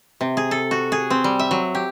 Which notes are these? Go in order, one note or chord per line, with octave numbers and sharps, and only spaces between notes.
C3
G#4
A4
F#4
G#4
C4
G3
E5
F#3
G4